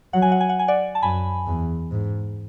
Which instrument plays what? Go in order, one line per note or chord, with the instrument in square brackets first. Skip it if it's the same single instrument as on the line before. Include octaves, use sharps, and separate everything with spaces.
[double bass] F#3 [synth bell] F#5
[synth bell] G#5
F#5
G#5
F#5
G#5
D5 F#5
A5
[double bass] F#2 [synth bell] G#5 B5
[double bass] E2
G#2